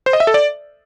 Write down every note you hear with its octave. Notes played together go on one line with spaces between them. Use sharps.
C5
D#5
E5
A4
D5